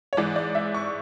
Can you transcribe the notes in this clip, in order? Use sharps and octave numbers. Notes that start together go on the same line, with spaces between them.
C#5
G#2 E3 D5
D5
E5
C#6